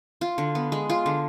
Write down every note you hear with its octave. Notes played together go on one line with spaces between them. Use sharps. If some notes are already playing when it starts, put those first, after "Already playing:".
F4
D3
B3
G#3
F4
D3